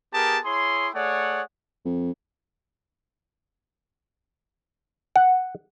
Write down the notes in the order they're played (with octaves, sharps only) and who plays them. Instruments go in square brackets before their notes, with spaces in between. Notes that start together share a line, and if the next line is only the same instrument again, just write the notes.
[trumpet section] B3 G4 G#4 A#4 A5
E4 G#4 C#5 C6
A3 G#4 C#5 D5 F#5
[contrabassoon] F2
[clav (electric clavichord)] F#5